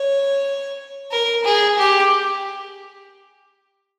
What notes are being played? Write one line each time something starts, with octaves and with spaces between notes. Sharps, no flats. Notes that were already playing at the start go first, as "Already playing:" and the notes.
Already playing: C#5
A#4
G#4
G4